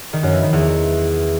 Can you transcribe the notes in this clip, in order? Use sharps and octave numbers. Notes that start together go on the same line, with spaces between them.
D#3
F#2
E3
D#3
E2